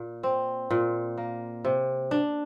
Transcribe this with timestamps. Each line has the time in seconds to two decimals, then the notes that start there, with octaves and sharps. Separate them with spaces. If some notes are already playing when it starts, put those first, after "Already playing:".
Already playing: A#2
0.23 C4
0.70 A#2
1.17 A#3
1.65 C3
2.11 D4